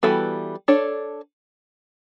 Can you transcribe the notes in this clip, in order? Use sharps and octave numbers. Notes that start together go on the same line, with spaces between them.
E3 G3 B3 F#4 A4
D4 A4 C#5